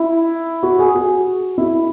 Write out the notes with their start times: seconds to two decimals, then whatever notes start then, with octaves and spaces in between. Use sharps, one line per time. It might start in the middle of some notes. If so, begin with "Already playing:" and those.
Already playing: E4
0.63 F#4
0.79 G#4
0.95 F#4
1.58 E4